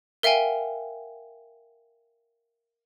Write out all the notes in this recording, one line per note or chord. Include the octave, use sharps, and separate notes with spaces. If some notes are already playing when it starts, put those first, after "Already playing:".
A#4 E5 F5 G5 G#5